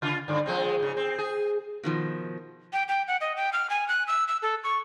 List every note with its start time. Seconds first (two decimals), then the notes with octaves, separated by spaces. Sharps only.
0.02 C#3 F4
0.28 G2 D3
0.46 F3 G#3 C4
0.79 G#2 C#3
0.97 C4
1.18 G#4
1.83 B2 D#3 F3
2.73 G5
2.88 G5
3.08 F#5
3.21 D#5
3.37 G5
3.53 F6
3.70 G#5
3.88 F#6
4.07 E6
4.28 E6
4.42 A4
4.64 C#6